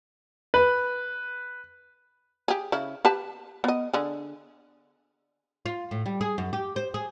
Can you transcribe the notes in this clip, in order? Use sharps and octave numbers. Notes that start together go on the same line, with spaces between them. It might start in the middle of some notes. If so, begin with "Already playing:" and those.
B4
G4 G#4
C#3 E4
G4 B4 A5
B3 D#5
D3 G#4
F4
A2
G3
G#4
F#2
G4
C5
G#4